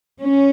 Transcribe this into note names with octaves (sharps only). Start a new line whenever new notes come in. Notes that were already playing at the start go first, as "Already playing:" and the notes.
C#4